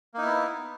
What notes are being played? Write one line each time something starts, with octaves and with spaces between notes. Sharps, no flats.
A#3 B3 D#4 E4